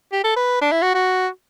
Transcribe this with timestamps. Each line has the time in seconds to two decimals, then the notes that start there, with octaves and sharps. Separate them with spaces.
0.12 G4
0.24 A4
0.36 B4
0.61 D4
0.72 E4
0.83 F#4
0.95 F#4